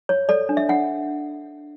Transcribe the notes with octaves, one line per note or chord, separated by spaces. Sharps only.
C#5
A4 D5
D4
E5
D4 F#5